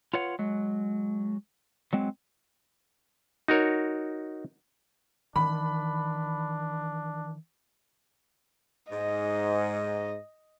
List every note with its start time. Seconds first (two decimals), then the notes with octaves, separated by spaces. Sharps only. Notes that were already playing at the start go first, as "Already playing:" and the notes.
0.14 F4 B4 C#5 F#5
0.39 F#3 G#3
1.93 F#3 G#3 C4
3.48 D#4 F#4 A#4 C#5
5.36 D#3 E3 D4 B5
8.91 G#2 D#5